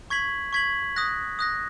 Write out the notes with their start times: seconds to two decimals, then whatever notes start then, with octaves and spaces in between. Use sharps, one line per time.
0.10 C#6 G#6 B6 F#7
0.53 C#6 G#6 B6 F#7
0.96 D#6 F#6 A#6
1.39 D#6 F#6 A#6